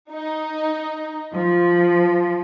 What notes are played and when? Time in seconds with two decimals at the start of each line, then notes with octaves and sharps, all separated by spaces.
0.11 D#4
1.33 F3